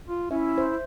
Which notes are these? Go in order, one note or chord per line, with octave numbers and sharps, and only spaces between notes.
F4
C#4 E4 E5
C5